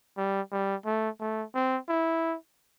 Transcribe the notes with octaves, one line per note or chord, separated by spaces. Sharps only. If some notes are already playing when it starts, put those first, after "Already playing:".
G3
G3
A3
A3
C4
E4